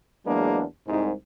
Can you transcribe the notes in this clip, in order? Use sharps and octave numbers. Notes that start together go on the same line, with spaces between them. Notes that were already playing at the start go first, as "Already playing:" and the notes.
E2 F#3 G#3 A#3 D4
C2 G#2